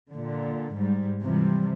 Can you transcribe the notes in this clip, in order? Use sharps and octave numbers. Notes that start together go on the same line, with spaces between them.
A#2 D3
G#2 G3
C3 E3 F3 G3